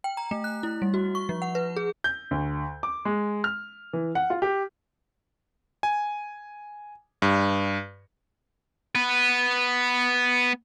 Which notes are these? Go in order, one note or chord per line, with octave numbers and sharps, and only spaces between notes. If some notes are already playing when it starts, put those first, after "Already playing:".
G5
A#5
A3
F#6
E4
G3
F#4
C#6
F3
F#5
B4
G#4
G6
D2
D6
G#3
F6
E3
F#5
F4
G4
G#5
G2
B3 B4